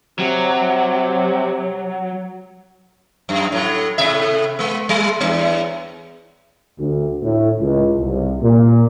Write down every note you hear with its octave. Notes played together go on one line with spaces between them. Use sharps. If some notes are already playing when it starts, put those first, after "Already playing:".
C3 F#3
F#2
A2 F#3
A2 C3 E5
G#3 B3
G3
E2 B3
D2
A2
C#2
C2
A#2